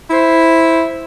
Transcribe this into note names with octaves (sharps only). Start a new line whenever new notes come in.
E4 C5